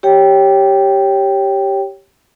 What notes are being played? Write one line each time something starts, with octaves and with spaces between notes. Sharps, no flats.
G4 C#5 G5